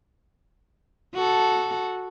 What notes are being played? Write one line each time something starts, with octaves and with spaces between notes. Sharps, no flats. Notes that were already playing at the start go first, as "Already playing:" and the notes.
F#4 A4